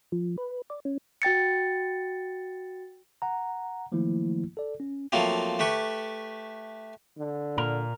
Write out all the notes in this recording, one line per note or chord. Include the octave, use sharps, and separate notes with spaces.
F3
B4
D5
C#4
F#4 G5 A6 C#7
F#5 A#5
D#3 F3 F#3 A3 A#3 E4
A4 D5
C#4
F3 F#3 A3 A#3 C4
A3 G4 B4 C#6
D3
A#2 A#4